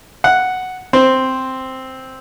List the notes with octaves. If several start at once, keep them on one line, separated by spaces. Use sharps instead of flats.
F#5
C4